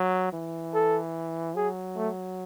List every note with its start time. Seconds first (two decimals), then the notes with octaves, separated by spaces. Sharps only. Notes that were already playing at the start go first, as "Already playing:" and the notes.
Already playing: F#3
0.33 E3
0.74 A4
1.56 F#3 G#4
1.96 A3